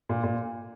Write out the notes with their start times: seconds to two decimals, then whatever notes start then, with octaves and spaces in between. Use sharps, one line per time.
0.09 A#2
0.23 A#2